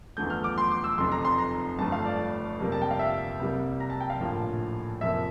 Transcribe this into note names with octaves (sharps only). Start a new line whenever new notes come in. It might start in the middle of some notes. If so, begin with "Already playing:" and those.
E2 D3 F3 A3 G6
F6
D6
C6
D6
E6
F1 F2 C3 C6
A#5
C6
A#5
G1 G2 F3 A3 A5
F5
D5
F2 C3 G3 A#3
A5
G5
F5
E5
C2 C3 G3 A#3
A#5
A5
G5
F5
A#1 A2 F3 A#3
F2 C3 F3 A#3 E5